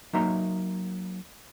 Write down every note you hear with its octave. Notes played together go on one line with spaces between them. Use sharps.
F#3 A#3 D#4 E5 A#5 C6